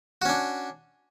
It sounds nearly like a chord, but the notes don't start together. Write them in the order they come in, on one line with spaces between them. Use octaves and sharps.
F#4 C#4 D4